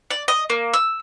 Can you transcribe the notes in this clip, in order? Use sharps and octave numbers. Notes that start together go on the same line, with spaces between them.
D5
D#5
A#3
E6